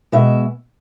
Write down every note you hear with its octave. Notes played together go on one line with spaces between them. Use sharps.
B2 G#3 E5